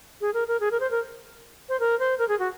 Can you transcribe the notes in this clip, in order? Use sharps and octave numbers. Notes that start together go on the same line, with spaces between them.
G#4
A#4
A#4
G#4
A#4
C5
A#4
C5
A#4
C5
A#4
G#4
F#4